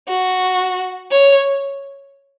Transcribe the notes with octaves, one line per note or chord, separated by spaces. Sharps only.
F#4
C#5